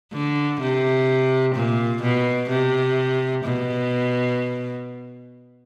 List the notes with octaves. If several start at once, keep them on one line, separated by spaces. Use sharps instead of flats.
D3
C3
A#2
B2
C3
B2